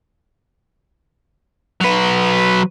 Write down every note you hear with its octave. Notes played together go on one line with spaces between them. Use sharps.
F#3 B4